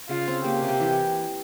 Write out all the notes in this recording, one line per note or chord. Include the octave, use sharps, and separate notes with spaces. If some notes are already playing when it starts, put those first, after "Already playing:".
C#3 F4
C4
A#3 G4
C3
E3